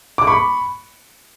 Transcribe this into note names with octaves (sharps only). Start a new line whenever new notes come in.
D6
B5 C#6